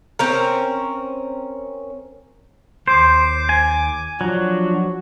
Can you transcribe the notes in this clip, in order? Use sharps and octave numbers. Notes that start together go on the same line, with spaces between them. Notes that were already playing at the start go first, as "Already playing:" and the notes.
C4 C#4 A#4
D#2 C5 D6
G#5
F3 F#3 D4 F#4